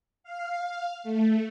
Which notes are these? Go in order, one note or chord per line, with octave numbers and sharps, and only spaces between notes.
F5
A3